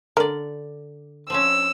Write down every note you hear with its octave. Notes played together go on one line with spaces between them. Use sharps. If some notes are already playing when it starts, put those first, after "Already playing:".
D3 A#4 D5
F3 C4 C#4 E6